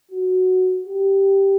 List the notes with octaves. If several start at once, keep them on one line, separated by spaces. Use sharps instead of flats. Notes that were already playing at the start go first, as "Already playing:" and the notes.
F#4
G4